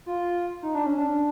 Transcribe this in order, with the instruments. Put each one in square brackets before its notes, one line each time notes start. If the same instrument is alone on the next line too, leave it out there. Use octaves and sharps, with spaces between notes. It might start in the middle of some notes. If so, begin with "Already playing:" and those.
[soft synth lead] F4
D#4
D4
C#4
D4